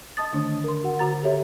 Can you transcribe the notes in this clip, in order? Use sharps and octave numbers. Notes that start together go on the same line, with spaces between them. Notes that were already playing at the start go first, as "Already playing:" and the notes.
D#5 A5 D#6 A6
D3 D#3 A3 D4
A#4 C6
F#4 F#5
D3 F#4 A#5 A6
G4 A4 C#5 E5